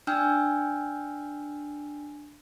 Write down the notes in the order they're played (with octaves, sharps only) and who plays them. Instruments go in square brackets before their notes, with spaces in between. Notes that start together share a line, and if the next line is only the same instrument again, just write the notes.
[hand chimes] D4 G5 G#5 E6 F6 G6